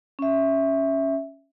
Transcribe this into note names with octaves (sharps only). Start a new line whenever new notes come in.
C#4 E5